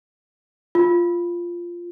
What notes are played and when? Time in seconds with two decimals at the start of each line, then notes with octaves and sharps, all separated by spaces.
0.75 F4